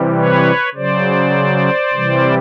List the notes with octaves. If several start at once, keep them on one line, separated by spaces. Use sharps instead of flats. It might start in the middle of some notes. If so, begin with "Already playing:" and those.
Already playing: C3 E3 G3
B4 C#5
C#3 F#3 C5 D5
C3 E3 G3